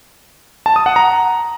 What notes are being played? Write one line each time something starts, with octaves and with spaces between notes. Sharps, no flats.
A5
D#6
F#5
A#5